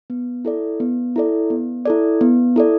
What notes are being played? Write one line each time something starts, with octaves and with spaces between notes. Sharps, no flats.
B3
E4 A4 D5
B3
E4 A4 D5
B3
E4 A4 D5
B3
E4 A4 D5